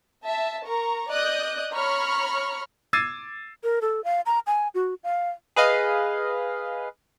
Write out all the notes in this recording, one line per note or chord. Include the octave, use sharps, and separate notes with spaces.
E5 A5
A#4 A#5 C#6
D5 D#5 D#6 F#6 G6
C#5 A#5 B5 C#6 F6
D6 E6 G#6 A6 C7 D#7
A#4
A4
F5
A#5
G#5
F#4
F5
G#4 B4 D#5 F5